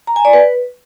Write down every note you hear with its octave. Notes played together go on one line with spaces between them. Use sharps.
A#5
G#5
D5
B4